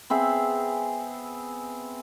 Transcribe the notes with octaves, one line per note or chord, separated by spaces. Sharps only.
B3 C4 G#4 E5